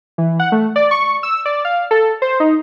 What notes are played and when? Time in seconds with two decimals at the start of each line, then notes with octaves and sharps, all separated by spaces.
0.18 E3
0.40 F#5
0.52 A3
0.76 D5
0.91 C#6
1.23 E6
1.45 D5
1.65 F5
1.91 A4
2.22 C5
2.40 D#4